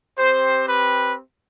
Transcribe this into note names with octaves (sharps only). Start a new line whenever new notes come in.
C4 G4 C5
B4